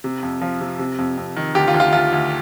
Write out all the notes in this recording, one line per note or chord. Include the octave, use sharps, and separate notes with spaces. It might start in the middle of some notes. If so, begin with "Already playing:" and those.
C3
F2
F3
C3
C3
F2
F2
D#3
D2 G4
F4
D2
F4
D2 F4
D2